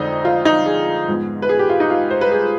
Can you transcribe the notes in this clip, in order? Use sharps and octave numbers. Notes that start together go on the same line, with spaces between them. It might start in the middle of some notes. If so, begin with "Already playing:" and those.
Already playing: F2 D3 G#3 C4 D#4 D#5
F4
D#4
G#4
G#2 F3 B3
B4
G#4
G4
F4
D#4
F4
C5
B4
G#4